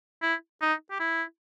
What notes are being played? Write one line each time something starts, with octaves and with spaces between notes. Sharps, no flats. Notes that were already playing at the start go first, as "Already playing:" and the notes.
E4
D#4
G4
E4